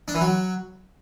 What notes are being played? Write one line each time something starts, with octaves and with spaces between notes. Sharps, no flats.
D4
E3
F#3